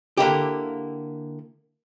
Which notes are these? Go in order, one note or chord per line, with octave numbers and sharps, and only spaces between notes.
D3 A#3 E4 G4